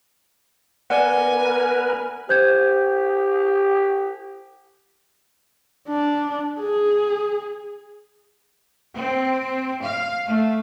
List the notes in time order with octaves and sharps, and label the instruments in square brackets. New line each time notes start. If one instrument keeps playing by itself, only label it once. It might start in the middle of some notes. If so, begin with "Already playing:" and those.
[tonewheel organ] B3 A#4 B4 [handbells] D5 F#5 [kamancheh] G#5
[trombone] G4 [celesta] C5 G6 G#6
[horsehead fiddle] D4
G#4
[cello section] C4
F5
A3